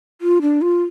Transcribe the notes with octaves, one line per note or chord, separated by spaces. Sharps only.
F4
D4
F4